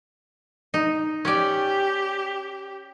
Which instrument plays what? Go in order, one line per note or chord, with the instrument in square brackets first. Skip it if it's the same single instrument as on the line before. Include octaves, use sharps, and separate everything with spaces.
[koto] D#4
[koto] C#4 D5 [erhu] G4